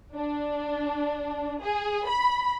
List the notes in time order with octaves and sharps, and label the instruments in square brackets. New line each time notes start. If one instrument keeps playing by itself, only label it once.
[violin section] D4
G#4
B5